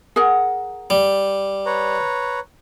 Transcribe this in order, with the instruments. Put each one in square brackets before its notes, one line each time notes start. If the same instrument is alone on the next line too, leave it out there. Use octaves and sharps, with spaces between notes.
[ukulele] G#4 A#4 F#5
[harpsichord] G3
[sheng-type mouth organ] B4 C#5 A#5